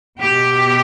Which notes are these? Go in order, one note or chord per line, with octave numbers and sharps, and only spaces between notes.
B2 G4